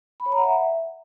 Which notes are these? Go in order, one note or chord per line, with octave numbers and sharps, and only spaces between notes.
B5
C#5
A#5
F#5
E5